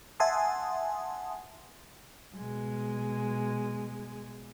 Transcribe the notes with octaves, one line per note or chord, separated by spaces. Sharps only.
E5 F#5 G#5 A5 C6 D#6
B2 G#3